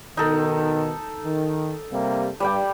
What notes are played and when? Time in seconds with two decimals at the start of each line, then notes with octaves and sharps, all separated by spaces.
0.17 B2 D#3 D#4 A4
1.24 D#3
1.91 C3 G3 A#3
2.40 G2 G3 D5 G5